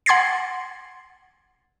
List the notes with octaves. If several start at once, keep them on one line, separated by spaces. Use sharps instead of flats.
F#5 C6 G#6 A6 C7